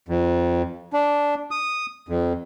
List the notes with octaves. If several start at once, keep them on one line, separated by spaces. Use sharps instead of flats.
F2
D4
D#6
F2